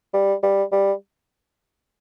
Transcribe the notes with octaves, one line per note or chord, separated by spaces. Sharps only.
G3
G3
G3